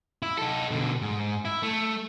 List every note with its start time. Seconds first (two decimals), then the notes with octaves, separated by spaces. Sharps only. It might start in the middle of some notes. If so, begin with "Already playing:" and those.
0.23 E4
0.38 D#4 A4
0.71 B2 D3
1.02 G#2
1.45 E4
1.63 A3